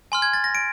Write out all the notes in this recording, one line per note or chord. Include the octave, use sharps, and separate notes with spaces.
G#5 C6 F6
G#6
A6
A#6
D7